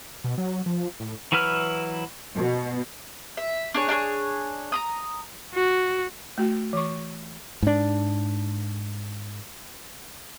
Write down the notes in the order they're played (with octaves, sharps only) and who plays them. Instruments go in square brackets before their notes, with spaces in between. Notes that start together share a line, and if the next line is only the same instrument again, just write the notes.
[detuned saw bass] B2
F#3
F3
A2
[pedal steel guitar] E3 F#3 E4 B4 F6
[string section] B2
[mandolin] E5
D4 G#4 C#5
D4 G#4 A#4 C#5
A#5 B5 D#6
[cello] F#4
[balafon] A3 F#4
E3 C#6
[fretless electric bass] G#2 D4